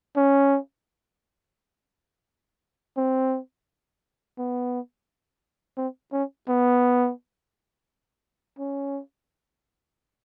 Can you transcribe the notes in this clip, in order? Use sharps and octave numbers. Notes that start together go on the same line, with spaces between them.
C#4
C4
B3
C4
C#4
B3
C#4